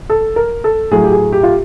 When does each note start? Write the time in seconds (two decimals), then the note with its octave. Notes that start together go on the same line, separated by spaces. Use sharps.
0.10 A4
0.36 A#4
0.64 A4
0.91 A2 F#3 G#4
1.04 G4
1.12 G#4
1.32 G4
1.43 F4